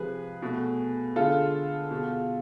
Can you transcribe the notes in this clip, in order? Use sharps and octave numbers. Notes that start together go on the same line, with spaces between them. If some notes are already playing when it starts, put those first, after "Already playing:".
Already playing: C3 F3 G#3 G#4 B4
B2 A3
D3 G#3 F4 A4
B2 G#3